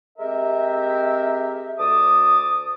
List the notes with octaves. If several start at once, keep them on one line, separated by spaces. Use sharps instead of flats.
G#3 C4 G4 A#4 E5
D2 A5 D6 D#6